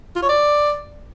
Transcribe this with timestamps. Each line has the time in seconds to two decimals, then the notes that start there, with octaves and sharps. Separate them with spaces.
0.16 F4
0.22 C#5
0.29 D5